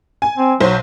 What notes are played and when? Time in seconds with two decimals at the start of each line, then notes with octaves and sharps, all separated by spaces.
0.22 G#5
0.38 C4
0.61 B1 F#3 C5